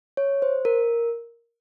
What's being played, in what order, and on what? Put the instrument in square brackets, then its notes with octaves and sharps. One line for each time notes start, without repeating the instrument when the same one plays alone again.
[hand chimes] C#5
C5
A#4